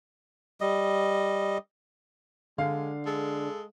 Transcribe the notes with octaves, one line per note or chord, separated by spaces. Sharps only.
G3 D#5
D3 G#3 F5
G#3 A4